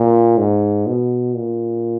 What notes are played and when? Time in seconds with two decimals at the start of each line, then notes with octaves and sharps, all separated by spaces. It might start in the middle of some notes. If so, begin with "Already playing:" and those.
Already playing: A#2
0.38 G#2
0.87 B2
1.36 A#2